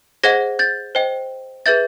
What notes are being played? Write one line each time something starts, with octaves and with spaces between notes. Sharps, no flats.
G#4 C5 D#5 F#5 G#6 A#6
G6 A6
C5 D#5 G5
G#4 B4 E5 G6 A6